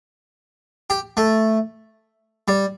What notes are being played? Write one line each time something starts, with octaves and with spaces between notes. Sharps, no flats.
G4
A3
G3